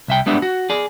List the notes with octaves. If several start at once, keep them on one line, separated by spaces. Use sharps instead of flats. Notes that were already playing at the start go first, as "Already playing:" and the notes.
C2 E5 G5
G3 G#3 B3 D4 E5
F#4
G#4 D5